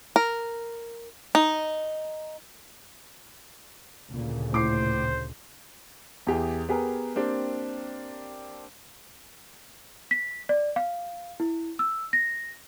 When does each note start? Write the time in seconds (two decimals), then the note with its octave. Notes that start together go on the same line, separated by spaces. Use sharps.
0.16 A#4
1.35 D#4
4.10 D2 A#2 C#3
4.53 A2 C5 D6 C7
6.27 E2 G4 G#4
6.69 B3 G4 G#4 A#4
7.15 A#3 C4 D4 G4
10.11 B6
10.49 D5
10.76 F5
11.40 E4
11.79 E6
12.13 A#6